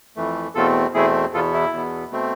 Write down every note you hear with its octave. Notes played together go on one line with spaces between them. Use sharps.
F2 E3 A3
E2 B2 A3 C4 F4 A4
E2 B2 A3 C4 E4 G#4
E2 B2 B3 F4 A4
E4
E2 B2 B3
B2 A3 C4